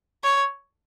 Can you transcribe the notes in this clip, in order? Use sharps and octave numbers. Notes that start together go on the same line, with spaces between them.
C#5